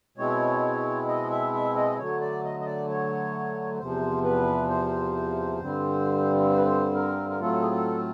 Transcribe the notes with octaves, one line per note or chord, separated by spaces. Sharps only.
B2 G#3 C4 E4 C#5
D#5
E5
E5
D#5
D3 F#3 A3 C#5
D5
D#5
D#5
D5
C#5
E2 C3 F3 C5
B4
C5
G2 D3 G3 C4
C5
B4
C5
A#4
A#4
A2 F#3 A3 C4 F4 A4
G#4
A4